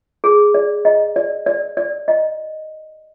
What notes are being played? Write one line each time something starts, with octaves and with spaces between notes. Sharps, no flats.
G#4
D5
D#5
D5
D5
D5
D#5